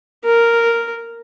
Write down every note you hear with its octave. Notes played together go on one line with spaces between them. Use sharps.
A#4